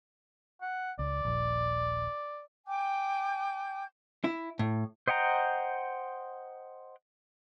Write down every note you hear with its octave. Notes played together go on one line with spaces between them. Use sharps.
F#5
C#2 D5
D#1 A#1
G5 G#5 D6 G6
E4
A2
C5 D#5 F#5 G5 A#5